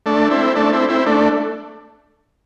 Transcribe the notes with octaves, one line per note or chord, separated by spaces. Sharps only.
A3 D4
C4 E4
A3 D4
C4 E4
C4 E4
A3 D4